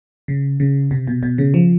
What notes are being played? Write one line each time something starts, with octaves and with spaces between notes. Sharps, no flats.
C#3
C#3
C3
B2
B2
C#3
F3